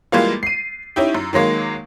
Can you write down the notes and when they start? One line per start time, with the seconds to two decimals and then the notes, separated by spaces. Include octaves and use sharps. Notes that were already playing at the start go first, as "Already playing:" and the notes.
0.12 E3 G3 G#3 A#3 F4
0.43 C7 D#7
0.96 C#4 D#4 E4 G4
1.15 F#2
1.33 D#3 F#3 G#3 A#3